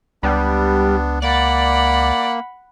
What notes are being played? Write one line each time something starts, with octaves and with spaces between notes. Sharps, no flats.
C#2 G3 B3 D4
A#3 D5 F#5 B5